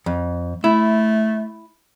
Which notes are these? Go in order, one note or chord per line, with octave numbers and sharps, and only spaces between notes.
F2
A3 E4